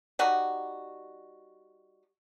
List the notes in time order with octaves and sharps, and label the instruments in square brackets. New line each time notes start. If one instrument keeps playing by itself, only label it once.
[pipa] G3 D#4 F#4